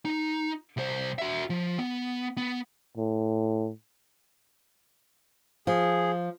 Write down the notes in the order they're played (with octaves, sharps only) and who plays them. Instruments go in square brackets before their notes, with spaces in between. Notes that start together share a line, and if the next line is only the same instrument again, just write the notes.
[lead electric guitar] D#4
C2 C5
F#4 E5
F3
B3
B3
[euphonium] A2
[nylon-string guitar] F3 [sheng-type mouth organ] G#4